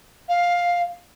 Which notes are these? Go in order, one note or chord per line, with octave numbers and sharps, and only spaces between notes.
F5